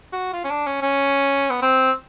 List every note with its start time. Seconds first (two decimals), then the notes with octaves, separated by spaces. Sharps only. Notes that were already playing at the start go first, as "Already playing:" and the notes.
0.13 F#4
0.33 F4
0.44 C#4
0.50 D4
0.66 C#4
0.82 C#4
1.50 B3
1.62 C4